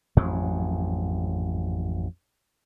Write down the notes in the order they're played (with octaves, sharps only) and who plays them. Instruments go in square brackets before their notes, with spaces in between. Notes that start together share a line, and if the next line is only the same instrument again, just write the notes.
[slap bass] A1 F2 G#2 F#3